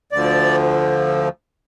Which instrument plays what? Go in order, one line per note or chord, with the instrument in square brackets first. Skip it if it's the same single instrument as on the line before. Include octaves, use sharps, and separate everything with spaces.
[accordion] D2 D3 F3 D5